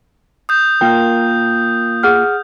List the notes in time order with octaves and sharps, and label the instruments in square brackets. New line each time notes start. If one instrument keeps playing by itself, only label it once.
[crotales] D#6 G6
[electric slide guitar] A#3 F4 A#4 [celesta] G5
[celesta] G#4 F#5 F6